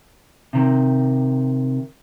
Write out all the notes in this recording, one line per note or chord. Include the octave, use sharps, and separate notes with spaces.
C3 D#3